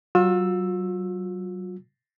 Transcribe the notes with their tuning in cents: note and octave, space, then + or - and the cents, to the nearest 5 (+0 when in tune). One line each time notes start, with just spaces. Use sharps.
F#3 +30 F4 +40 E6 +0